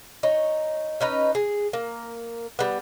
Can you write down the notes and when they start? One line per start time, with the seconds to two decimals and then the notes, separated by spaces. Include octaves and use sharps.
0.23 D#4 C#5
1.01 C#4 D#4 B4
1.35 G#4
1.73 A#3
2.59 G3 B3